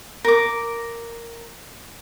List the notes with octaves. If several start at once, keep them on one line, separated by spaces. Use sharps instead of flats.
A#4 D6